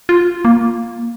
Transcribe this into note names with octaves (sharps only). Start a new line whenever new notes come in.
F4
A#3